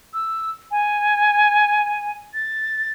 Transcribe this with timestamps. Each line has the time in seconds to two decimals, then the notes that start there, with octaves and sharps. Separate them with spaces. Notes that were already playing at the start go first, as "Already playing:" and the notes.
0.14 E6
0.71 G#5
2.34 A6